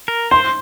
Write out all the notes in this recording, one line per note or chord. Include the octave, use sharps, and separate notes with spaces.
A#4
C5 C6